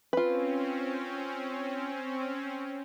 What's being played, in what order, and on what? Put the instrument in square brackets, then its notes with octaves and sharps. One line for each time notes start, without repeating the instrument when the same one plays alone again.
[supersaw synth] C4 C#4 [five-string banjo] F4 B4